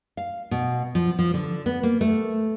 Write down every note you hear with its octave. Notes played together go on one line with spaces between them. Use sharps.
F5
B2
F3
F3
D3
B3
A#3
A3